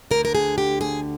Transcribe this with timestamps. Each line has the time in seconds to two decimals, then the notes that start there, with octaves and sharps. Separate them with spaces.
0.11 D2 D3 A#4
0.25 A#4
0.35 G#4
0.58 G4
0.81 G#4